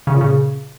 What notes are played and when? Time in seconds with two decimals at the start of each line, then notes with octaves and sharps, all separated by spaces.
0.07 C#3
0.14 A#2
0.21 C#3